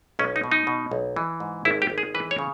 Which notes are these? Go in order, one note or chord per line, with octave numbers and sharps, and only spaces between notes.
B1 C#4
D#4
B2
D#4
B2
B1
E3
G#2
G#1 E4
G4
G#1
G#4
E3 B4
C#5
C#3